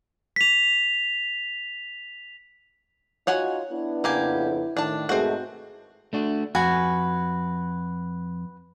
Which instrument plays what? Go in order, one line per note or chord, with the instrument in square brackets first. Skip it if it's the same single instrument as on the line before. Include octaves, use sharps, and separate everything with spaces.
[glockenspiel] B6 F7
[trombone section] D#4 F4 F#4 [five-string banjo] C#5 F#5 G#5
[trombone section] B3 D4 [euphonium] E4
[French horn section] F2 C#3 [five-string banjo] A#3 G4 G#5
[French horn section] A2 D#3 [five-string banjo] D4 A5
[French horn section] G#2 G#4 A#4 [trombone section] B2 G#3 A3 [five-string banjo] C4 F#4
[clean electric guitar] A3 D4 F#4
[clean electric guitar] F2 [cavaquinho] F#4 B4 G#5